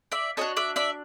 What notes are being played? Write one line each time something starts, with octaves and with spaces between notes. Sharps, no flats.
D5 E5
D4 F#4 A4 C#5 D#5
D5 E5
D5 E5